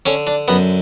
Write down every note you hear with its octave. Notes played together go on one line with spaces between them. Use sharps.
D3 C#4
D4
F#2 B3